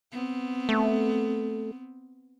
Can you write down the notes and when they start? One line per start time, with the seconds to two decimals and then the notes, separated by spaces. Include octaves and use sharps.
0.12 B3 C4
0.69 A3